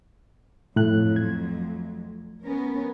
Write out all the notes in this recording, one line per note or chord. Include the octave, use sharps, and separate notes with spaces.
F2 A2 F#3 A3 F#6
G#6
B3 C#4 A#4